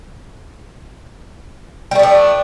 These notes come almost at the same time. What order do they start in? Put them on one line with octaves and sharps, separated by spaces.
G3 A3 F3 D4